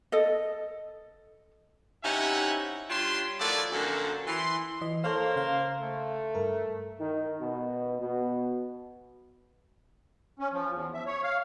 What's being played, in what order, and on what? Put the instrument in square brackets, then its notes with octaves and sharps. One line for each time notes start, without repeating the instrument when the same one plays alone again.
[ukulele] A4 D#5
[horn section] C3 C#4 D#4 E4 E5 F#5
G3 D4 F4 C#5 G5 C6
D#3 F3 A3 E4 F#4 D5
F#2 D3 A#3 C4 F#4 A4
E3 C6
[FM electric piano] E3 D#5
[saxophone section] A#3 C5 [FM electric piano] A4 C#5 F5
[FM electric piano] C#3 F5
[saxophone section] A3
[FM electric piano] G2 A#4
[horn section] D#3
B2
B2
[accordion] C#4
F3
E2
E5
C#5
F5